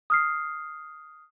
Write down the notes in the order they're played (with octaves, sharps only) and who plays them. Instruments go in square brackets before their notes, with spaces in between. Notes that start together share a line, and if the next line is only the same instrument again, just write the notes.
[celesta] D#6 F6 C7